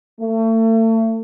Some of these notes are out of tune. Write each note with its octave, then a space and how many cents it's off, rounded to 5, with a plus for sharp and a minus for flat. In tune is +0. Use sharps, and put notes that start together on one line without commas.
A3 +35